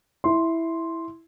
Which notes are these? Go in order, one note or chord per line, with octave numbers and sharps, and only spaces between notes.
E4 C6